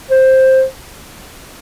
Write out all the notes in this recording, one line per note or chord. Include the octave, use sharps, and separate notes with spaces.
C5